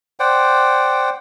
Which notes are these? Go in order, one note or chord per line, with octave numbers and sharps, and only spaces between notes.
C5 D5 F#5 G5